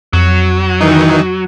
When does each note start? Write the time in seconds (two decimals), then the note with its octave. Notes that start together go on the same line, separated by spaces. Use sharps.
0.13 F2 F#3
0.80 D#3 E3 D#4